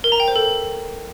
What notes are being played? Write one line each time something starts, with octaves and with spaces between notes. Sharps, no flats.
A#4
A#5
G5
C5
A4